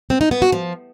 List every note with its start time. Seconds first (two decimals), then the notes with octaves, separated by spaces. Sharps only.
0.10 C4
0.21 D#4
0.31 B3
0.42 F#4
0.52 F3